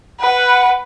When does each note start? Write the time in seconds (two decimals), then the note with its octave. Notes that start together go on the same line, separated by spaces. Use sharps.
0.20 B4 F#5